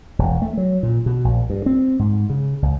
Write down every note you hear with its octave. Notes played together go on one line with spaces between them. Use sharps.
E1
A3
F#3
A#2
B2
A#1
G2
C4
G#2
C#3
C#2